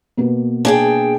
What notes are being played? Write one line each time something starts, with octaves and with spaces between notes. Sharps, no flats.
B2 A#3 B3
D4 G#4 G5